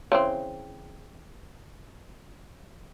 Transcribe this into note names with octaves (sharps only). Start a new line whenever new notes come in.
C#3 E3 C4